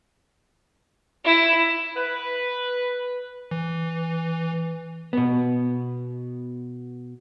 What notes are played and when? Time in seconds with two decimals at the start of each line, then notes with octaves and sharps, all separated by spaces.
1.24 E4
1.96 B4
3.51 E3
5.13 B2 B3